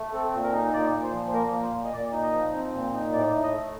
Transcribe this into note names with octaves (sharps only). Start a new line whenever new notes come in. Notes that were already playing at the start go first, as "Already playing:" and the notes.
Already playing: A3
C4 A4
A#2
A#4
D#4
A#2 D5
A#2
C5
F3
C5
A#3 A#4
A#2
C5
A#2
D#5
A#2 D5
D#4
D#5
F3
C4
A#2
D#4
A2 D5
A2
D#5
A3